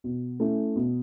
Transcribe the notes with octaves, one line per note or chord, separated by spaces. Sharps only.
B2
A3 C#4 E4
B2